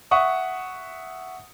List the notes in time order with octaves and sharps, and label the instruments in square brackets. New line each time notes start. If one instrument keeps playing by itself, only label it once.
[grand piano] E5 F#5 C#6 D#6